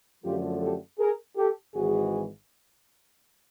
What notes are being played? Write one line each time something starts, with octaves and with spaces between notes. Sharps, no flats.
F#2 D3 F3 A3 F4 G4
G4 A4
G#4 A#4
G4 A4
G#1 G#2 E3 G#3 F#4 G#4